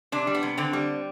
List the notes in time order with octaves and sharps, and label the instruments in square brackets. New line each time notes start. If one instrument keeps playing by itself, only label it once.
[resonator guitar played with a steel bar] C3 D4
G3
B3
C3
D3 C4
G3